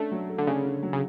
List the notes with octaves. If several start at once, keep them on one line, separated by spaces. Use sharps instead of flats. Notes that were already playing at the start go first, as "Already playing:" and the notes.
Already playing: A3 C#4 D4
F#3
A3
D3
C#3 C#4
D3
F#3
C#3